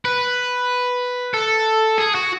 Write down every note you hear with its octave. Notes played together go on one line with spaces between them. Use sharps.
B4
A4
G#4
F#4